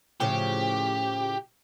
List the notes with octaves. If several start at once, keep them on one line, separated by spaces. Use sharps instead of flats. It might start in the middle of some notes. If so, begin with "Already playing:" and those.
A2 C#3 F3 G4